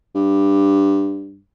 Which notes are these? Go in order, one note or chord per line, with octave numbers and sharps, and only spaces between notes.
G2